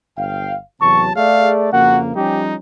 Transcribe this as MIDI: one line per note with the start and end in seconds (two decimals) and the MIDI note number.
0.18 0.57 31
0.18 0.57 77
0.18 0.57 79
0.81 1.10 40
0.81 1.10 48
0.81 1.10 54
0.81 1.13 81
0.81 1.03 85
1.16 1.71 57
1.16 1.70 68
1.16 1.70 74
1.16 1.51 77
1.73 2.16 41
1.73 2.16 49
1.73 2.16 58
1.73 1.99 66
1.73 1.99 78
2.16 2.55 53
2.16 2.55 55
2.16 2.55 61
2.16 2.55 63
2.16 2.42 67